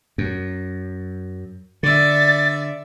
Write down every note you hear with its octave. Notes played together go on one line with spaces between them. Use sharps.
F#2
D3 D5 E5 A6